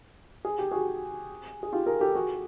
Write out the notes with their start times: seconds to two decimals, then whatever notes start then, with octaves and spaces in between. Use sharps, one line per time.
0.45 G#4
0.59 G4
0.71 F#4 G#4
1.63 G#4
1.72 F4 G4
1.86 G#4 A#4
2.01 G4 A4
2.15 F#4 G#4